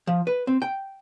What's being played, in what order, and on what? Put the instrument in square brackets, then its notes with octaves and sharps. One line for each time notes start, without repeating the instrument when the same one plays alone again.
[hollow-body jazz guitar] F3
B4
C4
G5